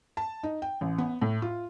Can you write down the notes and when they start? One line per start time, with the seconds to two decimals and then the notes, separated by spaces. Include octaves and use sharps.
0.17 A5
0.43 D#4
0.62 G5
0.81 A1
0.98 B3
1.22 A2
1.42 F4